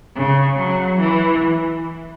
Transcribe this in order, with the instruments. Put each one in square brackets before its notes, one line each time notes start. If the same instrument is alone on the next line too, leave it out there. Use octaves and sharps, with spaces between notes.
[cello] C#3
F#3
E3